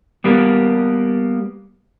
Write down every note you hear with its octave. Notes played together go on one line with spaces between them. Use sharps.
G3 A#3 B3